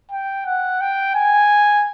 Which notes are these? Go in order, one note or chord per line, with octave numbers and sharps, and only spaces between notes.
G5
F#5
G5
G#5